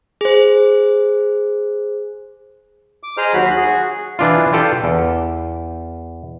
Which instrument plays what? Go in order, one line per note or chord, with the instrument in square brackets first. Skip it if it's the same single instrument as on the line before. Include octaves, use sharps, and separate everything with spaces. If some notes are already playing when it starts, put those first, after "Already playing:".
[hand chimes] G#4 C5
[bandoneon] D6
G#4 C5 D#5 A#5 F6
D#2 F#3 F#4 B5
F#4 G#4
[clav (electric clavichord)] E3 D4 F4
F4 G4 A4 D5
E2